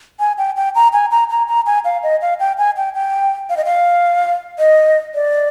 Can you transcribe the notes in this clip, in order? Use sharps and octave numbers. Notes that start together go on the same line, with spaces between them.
G#5
G5
G5
A#5
G#5
A#5
A#5
A#5
G#5
F5
D#5
F5
G5
G#5
G5
G5
F5
D#5
F5
D#5
D5